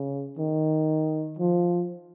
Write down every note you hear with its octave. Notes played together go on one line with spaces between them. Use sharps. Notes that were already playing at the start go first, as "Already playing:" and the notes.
Already playing: C#3
D#3
F3